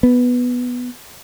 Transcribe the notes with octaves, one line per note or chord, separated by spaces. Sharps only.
B3